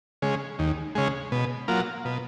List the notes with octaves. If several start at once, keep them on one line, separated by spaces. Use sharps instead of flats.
C#3 G#3
D#2
C#3 G#3
B2
F#3 A#3 F4
B2